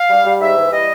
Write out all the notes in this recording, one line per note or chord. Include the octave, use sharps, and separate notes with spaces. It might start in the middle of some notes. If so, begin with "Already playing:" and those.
Already playing: F5
G3
G3
G#2 E5
E3
G3 D#5